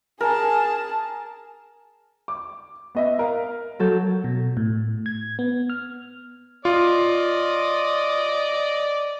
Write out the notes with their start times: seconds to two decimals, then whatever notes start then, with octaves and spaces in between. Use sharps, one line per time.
0.21 G#4 A#4 G#5 A5
2.28 D6
2.95 B3 D#5 E5
3.19 A#4 F5
3.79 F#3 A4 G6
4.24 B2
4.57 A2
5.06 G#6
5.39 B3
5.70 F6
6.65 F4 D5 D#5